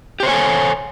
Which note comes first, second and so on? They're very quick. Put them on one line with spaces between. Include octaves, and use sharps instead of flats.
G4 C5 C#5 G#5 A4